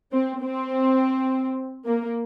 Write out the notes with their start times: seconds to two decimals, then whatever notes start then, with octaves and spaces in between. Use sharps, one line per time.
0.12 C4
0.42 C4
1.86 A#3